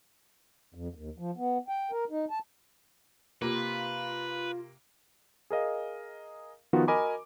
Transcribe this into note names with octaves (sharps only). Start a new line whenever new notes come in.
F2
D#2
F3
B3
G5
A#4
D#4
A5
C3 A#3 F4 B4
G#4 A#4 D#5 F5
D#3 F3 B3 D#4 F4 F#4
F#4 A#4 D#5 G#5 B5 D6